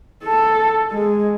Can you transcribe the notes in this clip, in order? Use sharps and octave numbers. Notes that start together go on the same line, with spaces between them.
A4
G#3